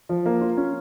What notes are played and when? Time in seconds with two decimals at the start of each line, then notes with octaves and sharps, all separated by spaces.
0.09 F3
0.26 A#3
0.41 F4
0.57 C#4